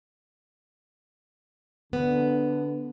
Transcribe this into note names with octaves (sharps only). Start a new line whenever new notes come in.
D3 B3